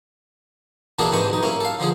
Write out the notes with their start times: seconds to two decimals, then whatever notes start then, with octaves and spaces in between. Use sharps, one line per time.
0.99 B2 E3 A#3 D4 G#4 A4
1.11 G#2 C3 E3 G#3 C#6
1.30 B1 D#4
1.43 A#3 C#4 E4
1.60 A4 F5
1.80 D3 F3 G#4